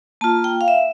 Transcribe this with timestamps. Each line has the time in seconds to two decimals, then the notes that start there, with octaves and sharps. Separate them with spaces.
0.21 A#3 F4 A5
0.44 G5
0.61 F5
0.68 E5